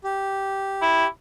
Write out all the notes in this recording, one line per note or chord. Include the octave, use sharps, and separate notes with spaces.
G4
E4